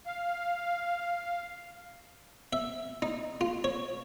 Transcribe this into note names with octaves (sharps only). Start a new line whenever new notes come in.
F5
E5
D#4
F4
C#5